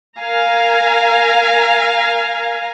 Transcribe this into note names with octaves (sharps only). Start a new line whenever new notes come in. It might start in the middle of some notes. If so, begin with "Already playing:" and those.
A#4 F5 G#5 A#5